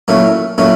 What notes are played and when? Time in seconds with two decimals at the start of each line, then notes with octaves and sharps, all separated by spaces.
0.08 A#2 F#3 A3 C#4 E4
0.58 A#2 F#3 A3 C#4 E4